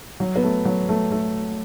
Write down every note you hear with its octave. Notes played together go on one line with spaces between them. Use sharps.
F#3
B3
A3
F#3
A3
A3